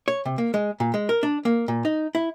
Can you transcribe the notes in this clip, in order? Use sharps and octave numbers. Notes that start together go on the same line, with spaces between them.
C#5
C3
A#3
G#3
A#2
G#3
A#4
D4
A#3
A#2
D#4
E4